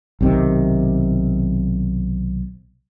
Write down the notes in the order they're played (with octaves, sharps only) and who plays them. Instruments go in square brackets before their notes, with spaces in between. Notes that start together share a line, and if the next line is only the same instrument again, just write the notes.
[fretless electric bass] B1 C3 D#3